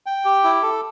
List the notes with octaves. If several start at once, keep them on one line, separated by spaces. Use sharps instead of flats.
G5
G4
E4
A4